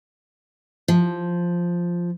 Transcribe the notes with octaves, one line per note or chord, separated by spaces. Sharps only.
F3